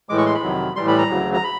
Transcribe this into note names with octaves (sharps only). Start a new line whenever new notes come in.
A2 E3 G#3 D6
C#6
C6
B5
F2 C3 D#3 F#3
A2 E3 G3 C6
B5
A#5
D2 C#3 F#3
A#5
B5